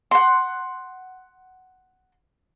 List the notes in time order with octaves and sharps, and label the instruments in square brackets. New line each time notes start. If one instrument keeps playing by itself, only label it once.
[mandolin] F#5 C6